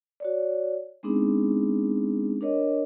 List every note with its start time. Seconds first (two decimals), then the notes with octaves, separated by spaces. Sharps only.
0.20 F#4 C#5 D5
1.03 G#3 B3 C4 D4 D#4 G#4
2.41 D4 A#4 C#5 D#5